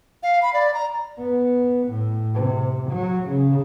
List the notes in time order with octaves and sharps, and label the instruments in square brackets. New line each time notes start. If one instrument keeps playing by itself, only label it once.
[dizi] F5
B5
D5
A#5
[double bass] B3
A2
C3
F#3
C#3